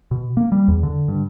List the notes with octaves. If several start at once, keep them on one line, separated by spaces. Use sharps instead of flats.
B2
A#3
G3
E2
D3
G2